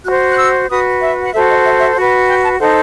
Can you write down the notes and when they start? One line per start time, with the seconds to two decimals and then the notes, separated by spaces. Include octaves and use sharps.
0.05 F#4 C5 F#6
0.32 F#6
0.38 E6
0.69 F#4 B4 D#6
1.01 E5
1.22 F#5
1.33 F#4 A4 C5 E5
1.49 D#5
1.64 E5
1.80 E5
1.96 F#4 B4 F#5
2.28 G5
2.44 A5
2.59 D#4 A4 C5 F#5